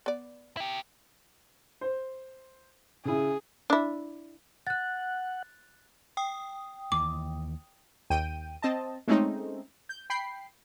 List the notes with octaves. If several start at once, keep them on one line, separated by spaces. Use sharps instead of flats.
B3 D5
E4 G4
C5
C#3 E4 G#4
D4 E4
F#5 F#6 A6
G5 D#6
D#2 E3 D6
D#2 G5 D#7
C4 D#5 A5
G#3 A3 C4 C#4 D#4
G6
G5 B5 C7